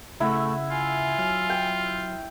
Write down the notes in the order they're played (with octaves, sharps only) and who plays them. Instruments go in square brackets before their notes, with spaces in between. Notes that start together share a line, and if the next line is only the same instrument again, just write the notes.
[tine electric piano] C#3 F#5 [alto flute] A3 [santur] E4
[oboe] F4 [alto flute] G#5
[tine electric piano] F#3 F6
[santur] G5